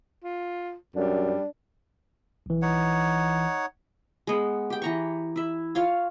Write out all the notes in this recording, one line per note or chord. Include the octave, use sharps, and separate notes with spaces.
F4
F#2 G3 D4
B1 E3
D#4 C#5 F#5
G#3 B3
G4 G5
E3 A#5 C#6
E4 E5
F4 C#5 F5